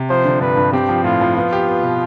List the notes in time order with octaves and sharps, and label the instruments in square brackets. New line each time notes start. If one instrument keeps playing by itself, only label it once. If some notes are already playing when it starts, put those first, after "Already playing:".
Already playing: [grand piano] C3
[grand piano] F3 [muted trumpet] C5
[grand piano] D3
[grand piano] G2 [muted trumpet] B4
[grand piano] G2
[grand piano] C4 [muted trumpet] G4
[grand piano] F3
[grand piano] A2 [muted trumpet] F4
[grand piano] F3
[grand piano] B3 [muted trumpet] F4
[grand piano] G4
B3
B2